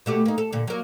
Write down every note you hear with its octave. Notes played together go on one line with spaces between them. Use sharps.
B2 A3 G4
A#3 D#4
A4
A#2 D3
F#3 A#3